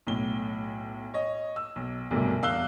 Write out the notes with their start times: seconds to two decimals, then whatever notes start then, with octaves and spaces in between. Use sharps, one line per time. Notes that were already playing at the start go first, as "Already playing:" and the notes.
0.07 B1 A2 G7
1.14 C#5 D#5
1.56 E6
1.76 B1
2.10 D1 B1 G2 C3 A3 A#3
2.42 E2 F5 E6 F#6 G7